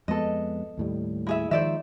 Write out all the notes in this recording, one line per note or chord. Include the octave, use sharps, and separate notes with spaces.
F2 G#3 B3 A4 D#5
D#2 A2 G3
E4 G#4 E5
D#3 F3 G#3 C5 D5 E5